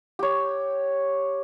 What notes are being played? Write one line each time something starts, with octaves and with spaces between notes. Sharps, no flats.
G4 C#5